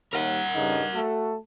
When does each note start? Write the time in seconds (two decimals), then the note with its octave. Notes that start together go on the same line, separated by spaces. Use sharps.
0.13 D#2 A#4 F#5
0.55 G2 C#3 D#4
0.94 A3 F#4 A4